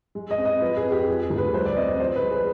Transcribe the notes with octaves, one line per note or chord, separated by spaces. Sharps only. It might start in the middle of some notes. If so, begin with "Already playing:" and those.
G#3
D#5
C4
D#5
F3 B4
G#4
F2
G4
F3 G#4
G#4
D2
B4
G3 C5
D5
C4 D#5
D5
F3 C5
B4
G#3
G#4